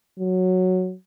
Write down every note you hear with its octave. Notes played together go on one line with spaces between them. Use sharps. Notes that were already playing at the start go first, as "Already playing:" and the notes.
F#3